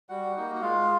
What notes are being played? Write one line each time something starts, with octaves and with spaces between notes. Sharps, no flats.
G3 F#4 F#5
A#3 D#4 F#4
F#5
G#3 F4 F5